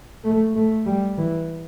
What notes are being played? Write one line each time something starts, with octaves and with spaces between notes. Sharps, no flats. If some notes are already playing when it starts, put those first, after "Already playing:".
A3
A3
G3
E3